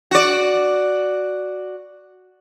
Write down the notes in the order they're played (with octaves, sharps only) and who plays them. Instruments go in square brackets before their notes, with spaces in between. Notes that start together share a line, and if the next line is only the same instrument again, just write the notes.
[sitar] F#4 D5